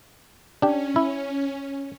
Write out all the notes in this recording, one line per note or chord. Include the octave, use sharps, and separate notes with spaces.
C#4 D4 G4
E4